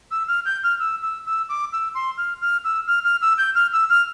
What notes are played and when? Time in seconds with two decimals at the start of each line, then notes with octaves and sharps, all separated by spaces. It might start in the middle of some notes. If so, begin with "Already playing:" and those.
0.11 E6
0.28 F6
0.45 G6
0.63 F6
0.80 E6
1.02 E6
1.26 E6
1.49 D6
1.73 E6
1.95 C6
2.17 F6
2.41 F6
2.64 E6
2.87 F6
3.04 F6
3.22 E6
3.38 G6
3.55 F6
3.73 E6
3.90 F6